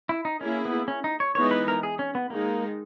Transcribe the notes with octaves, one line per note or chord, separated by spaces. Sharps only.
E4
D#4
A#3 C#4 E4 G#4
B3
C#4
D#4
C#5
E3 G#3 B3 D#4 C#5
B4
A#4
G#4
C#4
B3
D#3 G#3 A#3 D#4